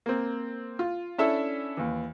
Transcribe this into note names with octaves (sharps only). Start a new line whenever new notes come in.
A#3 C4
F4
C#4 D4 E4 A4 E5
D#2 E3